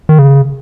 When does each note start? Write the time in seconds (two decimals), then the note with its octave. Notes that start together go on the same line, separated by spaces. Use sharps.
0.09 D#3
0.19 C#3